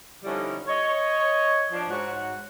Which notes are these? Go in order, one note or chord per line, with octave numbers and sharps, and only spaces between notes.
D3 F3 G3 C#4 D#4 E4
C#5 D#5
F3 D4
G#2 F#4 C#5